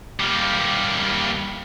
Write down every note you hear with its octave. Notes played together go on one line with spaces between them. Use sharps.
G3 A#3